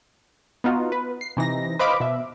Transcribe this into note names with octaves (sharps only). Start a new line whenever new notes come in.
B3 D#4 F4 F#4
B4
C7
C3 E3 D#4 A#6
B4 C5 D#5 F5 B5 D6
B2 E5